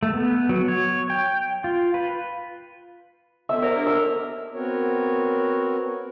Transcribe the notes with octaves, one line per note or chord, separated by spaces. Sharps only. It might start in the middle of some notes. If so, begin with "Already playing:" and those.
A3
B3
F#3
C#5
G5
F4
B4
B3 A4 D#5 E5 E6
B3 A#4 C5 D5 F#5
D4 G4 C#5
E6
B3 C4 F#4 A#4 C#5